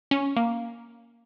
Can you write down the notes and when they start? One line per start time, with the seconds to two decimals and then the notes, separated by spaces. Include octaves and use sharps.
0.11 C#4
0.36 A#3